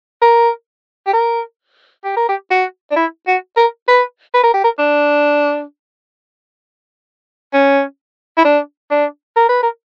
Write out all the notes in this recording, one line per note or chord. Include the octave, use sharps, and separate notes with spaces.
A#4
G4
A#4
G4
A#4
G4
F#4
D4
E4
F#4
A#4
B4
B4
A#4
G4
A#4
D4
C#4
E4
D4
D4
A#4
B4
A#4